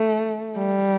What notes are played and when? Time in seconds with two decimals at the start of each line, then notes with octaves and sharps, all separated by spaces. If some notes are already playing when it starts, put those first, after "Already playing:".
Already playing: A3
0.56 G3